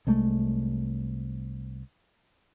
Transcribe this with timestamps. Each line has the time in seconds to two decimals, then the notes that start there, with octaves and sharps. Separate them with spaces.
0.07 C2 G#3 A3